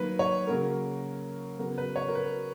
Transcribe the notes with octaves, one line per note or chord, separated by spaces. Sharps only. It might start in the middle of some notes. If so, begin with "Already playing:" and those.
Already playing: D#3 F#3 A#3 B4
C#5
C#3 F#3 A#3 A#4
C#3 F#3 B3 A#4
B4
C#5
A#4
B4